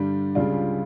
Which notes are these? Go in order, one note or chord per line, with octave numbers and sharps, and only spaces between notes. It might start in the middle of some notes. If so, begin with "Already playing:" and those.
Already playing: G2 D3 G3 D4
C#2 C#3 G3 D4 F4